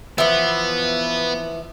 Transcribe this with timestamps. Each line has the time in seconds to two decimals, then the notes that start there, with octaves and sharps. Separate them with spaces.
0.18 E3 F3 B3